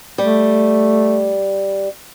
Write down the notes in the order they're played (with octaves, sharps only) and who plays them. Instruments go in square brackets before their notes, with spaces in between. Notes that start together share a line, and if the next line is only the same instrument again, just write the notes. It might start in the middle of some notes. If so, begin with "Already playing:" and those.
[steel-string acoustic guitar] G3 [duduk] A3